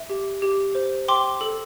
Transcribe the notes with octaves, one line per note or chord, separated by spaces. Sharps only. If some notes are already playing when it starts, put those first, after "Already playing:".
Already playing: E5
G4
G4
C5
G5 C6 D6
A4